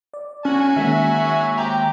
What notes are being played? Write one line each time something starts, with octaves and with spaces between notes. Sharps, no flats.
D5
F#3 C#4 F#4 G#5
D#3 G#3 A#3 E5
C4 G4 G5 A#5